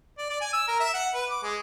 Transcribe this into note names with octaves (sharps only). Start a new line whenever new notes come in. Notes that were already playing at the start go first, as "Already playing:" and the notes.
D5
D5
G#5
E6
A#4
E5
F#5
B4
D6
G#3